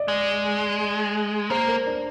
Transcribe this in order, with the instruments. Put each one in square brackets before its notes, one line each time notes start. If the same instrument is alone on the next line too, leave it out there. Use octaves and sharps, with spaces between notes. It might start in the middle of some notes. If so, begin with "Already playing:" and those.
Already playing: [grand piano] D5 D#5
[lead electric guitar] G#3
[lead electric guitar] A#3 [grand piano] C5
[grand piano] A#4
D4